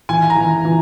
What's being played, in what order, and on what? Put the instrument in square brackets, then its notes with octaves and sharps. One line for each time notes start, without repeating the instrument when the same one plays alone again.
[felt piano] E3 [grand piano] G#5
[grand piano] A#5
[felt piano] E3
E3